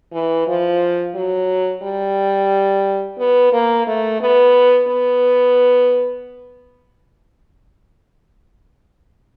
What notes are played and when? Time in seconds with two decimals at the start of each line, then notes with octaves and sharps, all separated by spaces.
0.13 E3
0.48 F3
1.15 F#3
1.83 G3
3.19 B3
3.53 A#3
3.87 A3
4.21 B3
4.89 B3